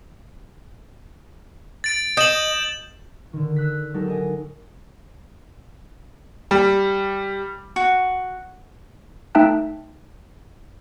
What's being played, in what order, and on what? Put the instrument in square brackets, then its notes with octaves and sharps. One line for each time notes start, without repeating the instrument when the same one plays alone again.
[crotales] A6 D7
[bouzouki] D#5 [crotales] G6 E7 F#7
[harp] D3 D#3
E6 F#6 B6
F#3 G#3 D#4 G4 A4 A#4
D4 D#5 G#5
[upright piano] G3
[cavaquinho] F#4
[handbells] A3 D#4 E5 G5 A5 F#6